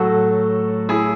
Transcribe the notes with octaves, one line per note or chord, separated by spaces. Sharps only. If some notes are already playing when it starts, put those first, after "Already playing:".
Already playing: A2 F#3 A3 F#4 A4
E4 G#4